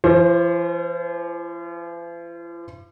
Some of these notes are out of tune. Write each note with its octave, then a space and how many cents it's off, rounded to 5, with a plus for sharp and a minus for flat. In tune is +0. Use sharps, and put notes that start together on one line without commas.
F3 -45 C5 +20